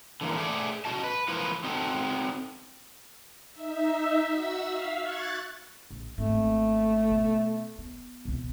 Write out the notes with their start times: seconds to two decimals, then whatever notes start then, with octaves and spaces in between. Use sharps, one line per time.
0.21 D3 E3 A#3
0.36 A3 G#4 D5
0.85 F#2 A#3 F#4 D#5 A5
1.04 B4
1.28 E3 F3 A#3 B4
1.64 C4 D#4 F#4 A4
3.52 D#4 E5
4.30 F#4 E6
4.66 E5 F5
4.98 C#6 F#6 G#6 A6
5.90 A#1
6.18 G#1 A3 A#3
7.09 B2 B3
7.78 B3
8.25 C2 B2